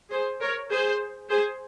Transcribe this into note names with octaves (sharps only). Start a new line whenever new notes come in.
G#4 C5
A#4 C#5
G#4 C5
G#4 C5